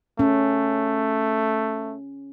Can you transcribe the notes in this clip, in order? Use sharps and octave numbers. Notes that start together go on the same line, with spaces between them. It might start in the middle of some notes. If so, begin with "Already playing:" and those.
A3 C#4